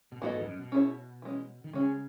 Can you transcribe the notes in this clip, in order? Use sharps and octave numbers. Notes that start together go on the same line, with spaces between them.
B2
A2 E3 B3 F#4 A4 D#5
G#2
E2
F#2
B2
C#4 E4 G#4 C#5
E3 G#3 C#4
D#3
C#3 G#3 C#4 G#4